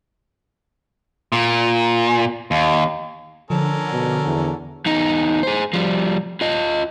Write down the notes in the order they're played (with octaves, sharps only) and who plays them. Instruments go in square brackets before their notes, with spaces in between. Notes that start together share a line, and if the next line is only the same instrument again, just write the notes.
[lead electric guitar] A#2
D#2
[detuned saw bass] D3 [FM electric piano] F3 [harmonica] C#4 A4 A#4
[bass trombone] B2
E2
[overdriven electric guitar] E2 D#4
G#4 C5
F3 G3
F4 D#5